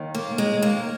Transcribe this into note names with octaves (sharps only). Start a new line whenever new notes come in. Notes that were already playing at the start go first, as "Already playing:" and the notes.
Already playing: D#2 D#3
A#3
G#3
A#3